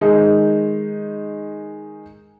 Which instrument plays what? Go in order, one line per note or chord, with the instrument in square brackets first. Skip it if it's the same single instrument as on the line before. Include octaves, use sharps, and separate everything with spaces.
[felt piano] D#3 G#3 D#4